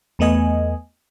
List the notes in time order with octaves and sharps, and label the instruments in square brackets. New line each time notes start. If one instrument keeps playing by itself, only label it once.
[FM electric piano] E2 A3 B3 D#5 G#5